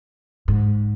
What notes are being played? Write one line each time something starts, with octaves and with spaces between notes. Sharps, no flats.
G#2